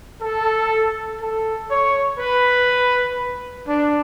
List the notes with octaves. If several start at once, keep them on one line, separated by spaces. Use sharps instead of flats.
A4
A4
C#5
B4
D4